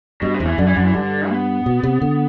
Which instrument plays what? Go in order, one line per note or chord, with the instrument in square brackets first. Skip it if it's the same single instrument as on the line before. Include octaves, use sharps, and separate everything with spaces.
[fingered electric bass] G2 [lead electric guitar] B2
[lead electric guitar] C3
[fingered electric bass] E2
[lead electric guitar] E3
[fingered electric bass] F#2 [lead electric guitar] D3
[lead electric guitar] E3
[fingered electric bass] F#2 [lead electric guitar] D3
[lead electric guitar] E3
[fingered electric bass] G2 [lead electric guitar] D3
[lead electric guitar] B3
[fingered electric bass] B2
C3
D3